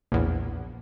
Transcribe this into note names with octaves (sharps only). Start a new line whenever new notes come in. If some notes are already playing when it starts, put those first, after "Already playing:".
A#1 E2